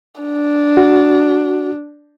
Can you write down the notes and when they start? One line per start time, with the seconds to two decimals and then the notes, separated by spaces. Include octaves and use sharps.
0.21 D4
0.77 F#4